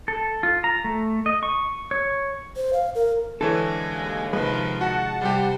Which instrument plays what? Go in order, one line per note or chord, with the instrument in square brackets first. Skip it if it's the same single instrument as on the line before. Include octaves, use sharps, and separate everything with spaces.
[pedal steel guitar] A4
F4
A#5
A3
D#5
C#6
C#5
[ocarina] C5
F5
A#4
[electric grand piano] D3 E3 C#5 [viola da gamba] G#3 [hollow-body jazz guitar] A4
[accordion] D#2
[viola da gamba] C3 D#3 F3 [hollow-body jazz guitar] G#3 [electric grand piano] B4
[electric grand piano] F#4 [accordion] F#5 A5
[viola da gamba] C3 C5 [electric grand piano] G3 G4